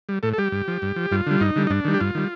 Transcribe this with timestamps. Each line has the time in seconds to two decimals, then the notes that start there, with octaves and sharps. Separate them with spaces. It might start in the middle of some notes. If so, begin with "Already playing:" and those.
0.09 G3
0.23 A2 A4
0.33 A4
0.38 G3 G4
0.52 G2
0.68 F3
0.82 G2
0.96 F3
1.11 G2 F4
1.27 D3 G3
1.40 G2 D#4
1.56 D3 G3
1.67 D#4
1.70 G2 D4
1.85 D#3 G3
1.94 G4
2.00 G2 F4
2.15 D#3 G3